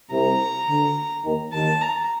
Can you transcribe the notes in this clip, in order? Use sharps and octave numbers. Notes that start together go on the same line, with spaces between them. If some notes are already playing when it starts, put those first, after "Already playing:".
C2 C3 A#5
D2 D3
D#2 D#3
D#2 D#3 A5
A#5